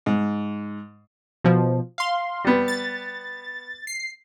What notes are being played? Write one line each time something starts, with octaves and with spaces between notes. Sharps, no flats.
G#2
B2 F3
F5 C6
G3 B3
A6
C7